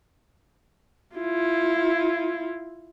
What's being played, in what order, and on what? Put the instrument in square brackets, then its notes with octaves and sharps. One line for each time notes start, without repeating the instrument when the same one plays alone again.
[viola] E4 F4